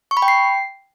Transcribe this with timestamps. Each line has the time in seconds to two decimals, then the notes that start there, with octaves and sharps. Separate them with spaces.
0.11 C#6
0.17 B5
0.22 G5
0.28 C7